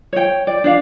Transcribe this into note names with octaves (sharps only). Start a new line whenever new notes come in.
C#5 G5
D5
D4 D5 F5